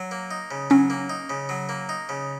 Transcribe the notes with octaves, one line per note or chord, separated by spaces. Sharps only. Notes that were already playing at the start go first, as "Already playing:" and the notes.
Already playing: F#3
A#3
D#4
C#3
F#3 C#4
A#3
D#4
C#3
F#3
A#3
D#4
C#3